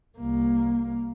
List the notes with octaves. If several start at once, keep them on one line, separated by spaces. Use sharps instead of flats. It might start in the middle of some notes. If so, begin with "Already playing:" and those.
C2 A#3